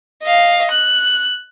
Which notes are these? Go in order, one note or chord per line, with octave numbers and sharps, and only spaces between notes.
D#5 F5
F#6